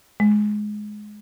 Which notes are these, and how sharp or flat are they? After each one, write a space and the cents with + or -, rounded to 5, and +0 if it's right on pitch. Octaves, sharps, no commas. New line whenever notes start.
G#3 +15